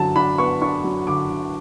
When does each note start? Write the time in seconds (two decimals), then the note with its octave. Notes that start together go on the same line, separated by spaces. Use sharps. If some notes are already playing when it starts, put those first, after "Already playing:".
Already playing: D3 F#3 A5
0.16 D4 B5
0.38 B3 C#6
0.61 D4 C#6
0.84 F#3
1.07 D3 D6
1.30 D3